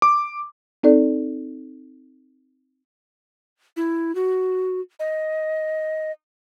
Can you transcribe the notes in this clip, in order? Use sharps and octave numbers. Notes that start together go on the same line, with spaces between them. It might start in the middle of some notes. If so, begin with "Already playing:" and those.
D6
C4 D#4 A4 D5
E4
F#4
D#5